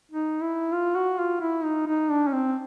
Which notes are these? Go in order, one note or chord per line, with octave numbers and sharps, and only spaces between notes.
D#4
E4
F4
F#4
F4
E4
D#4
D#4
D4
C#4
C4